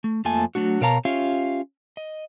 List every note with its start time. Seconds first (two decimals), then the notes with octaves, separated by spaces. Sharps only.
0.04 A3
0.25 F2 F3 A3 A#3 G#5 A5
0.55 F#3 A3 D4 F#4
0.81 B2 A#4 C#5 F5 A5 A#5
1.05 C#4 F4 G4 C#5 E5 F5
1.97 D#5